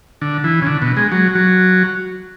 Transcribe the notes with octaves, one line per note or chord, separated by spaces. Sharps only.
D3
E3
C#3
D3
B2
G#3
F#3
F#3